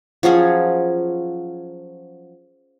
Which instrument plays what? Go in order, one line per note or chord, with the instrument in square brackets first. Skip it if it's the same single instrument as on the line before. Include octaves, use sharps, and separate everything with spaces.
[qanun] F3 F#3 C#4 G#4